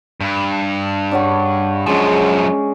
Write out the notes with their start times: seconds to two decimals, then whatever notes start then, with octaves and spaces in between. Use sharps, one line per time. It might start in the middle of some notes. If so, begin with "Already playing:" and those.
0.21 G2
1.12 D4 C#5 F#5
1.86 F#2 F3 G#3 C#4